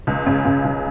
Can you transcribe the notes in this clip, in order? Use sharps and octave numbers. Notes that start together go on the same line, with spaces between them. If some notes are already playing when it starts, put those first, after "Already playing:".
C#2
C#3
C#3
C#2